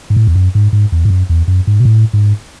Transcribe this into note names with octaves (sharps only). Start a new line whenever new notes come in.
G#2
A2
E2
F#2
G#2
G#2
E2
G#2
F#2
E2
F#2
G#2
B2
A2
G#2